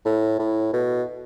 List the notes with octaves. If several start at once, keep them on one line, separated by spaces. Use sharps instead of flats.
A2
A2
B2